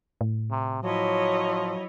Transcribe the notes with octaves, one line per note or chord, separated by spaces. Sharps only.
A2
C3
F3 F#3 E4 C#5 D#5